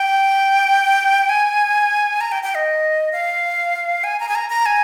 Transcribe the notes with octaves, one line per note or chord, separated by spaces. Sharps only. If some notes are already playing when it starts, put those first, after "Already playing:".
Already playing: G5
G#5
A#5
G5
G5
D#5
F5
G#5
A#5
G#5
A#5
A#5
G#5